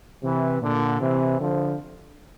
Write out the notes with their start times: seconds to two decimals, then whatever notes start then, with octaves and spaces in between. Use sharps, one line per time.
0.23 C3 E3
0.62 A#2 D3
1.01 C3 E3
1.40 D3 F3